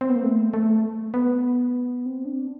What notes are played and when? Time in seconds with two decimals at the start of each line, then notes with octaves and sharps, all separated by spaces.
0.01 C4
0.09 B3
0.16 A#3
0.23 A3
0.54 A3
1.14 B3
2.06 C4
2.25 D4